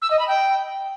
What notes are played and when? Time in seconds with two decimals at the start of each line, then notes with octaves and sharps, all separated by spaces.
0.02 E6
0.10 D#5
0.19 B5
0.28 G5